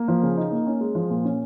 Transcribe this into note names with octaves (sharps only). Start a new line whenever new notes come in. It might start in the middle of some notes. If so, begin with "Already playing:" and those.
Already playing: A#3
F3
C#3
D#4
A#3
C#4
G#3
F3
A#2
C#4